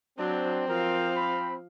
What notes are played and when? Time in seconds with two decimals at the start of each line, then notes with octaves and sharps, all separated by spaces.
0.19 F#3 C4 D4
0.68 F3 A#4 F5
1.16 B5